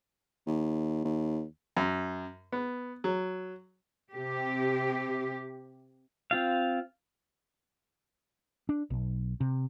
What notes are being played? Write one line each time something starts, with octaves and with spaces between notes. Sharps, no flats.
D#2
D#2
F#2
B3
F#3
C3 G4
C4 F4 F5
D4
B1
C3